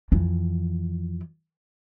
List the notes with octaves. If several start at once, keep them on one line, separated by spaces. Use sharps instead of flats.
F2 E3